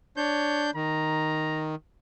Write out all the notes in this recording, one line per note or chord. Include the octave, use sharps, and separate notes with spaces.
D4 C#5 G6
D#3 A#5